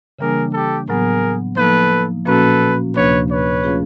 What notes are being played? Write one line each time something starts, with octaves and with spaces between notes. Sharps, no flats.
C#3 E3 G3 A#3 D4 G#4 A#4
G4 A4
A2 F#3 B3 G#4 A#4
F3 A#3 D#4 A4 B4
A#2 F3 A#3 C#4 F#4 A4 B4
D2 C3 F3 A#3 D4 B4 C#5
B4 C#5
F3 A3 C#4 F4 G#4